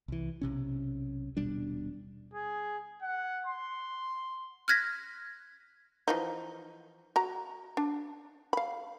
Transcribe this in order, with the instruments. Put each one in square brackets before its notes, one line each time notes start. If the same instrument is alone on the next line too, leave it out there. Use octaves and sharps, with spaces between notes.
[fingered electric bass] C2 E3
B1 C3 C#4
D#1 B2 G3 D4
[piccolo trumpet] G#4
F#5
C6
[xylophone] F6 F#6 G#6 A#6 B6
[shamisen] E3 F3 D#4
F#4 A#5
D4
F5 B5